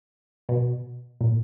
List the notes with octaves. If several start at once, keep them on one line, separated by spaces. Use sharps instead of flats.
B2
A#2